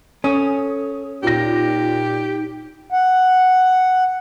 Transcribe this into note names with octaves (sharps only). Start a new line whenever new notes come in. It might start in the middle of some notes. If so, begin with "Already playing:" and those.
C#4 A4 D#6
A#2 D#4 G4 A#6
F#5